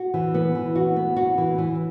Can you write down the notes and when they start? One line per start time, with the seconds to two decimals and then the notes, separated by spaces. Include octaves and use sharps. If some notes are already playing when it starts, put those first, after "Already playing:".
Already playing: F#4
0.14 E3
0.34 B3
0.55 E3
0.75 F#4
0.96 B3
1.16 F#4
1.38 E3
1.58 E3